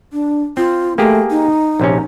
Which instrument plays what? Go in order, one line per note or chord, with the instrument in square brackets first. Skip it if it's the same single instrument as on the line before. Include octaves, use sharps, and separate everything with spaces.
[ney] D4
[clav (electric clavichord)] C4 [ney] F4
[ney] A3 [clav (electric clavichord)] A#3 G4 G#4
[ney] D#4
[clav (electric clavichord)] A#1 C3 C#4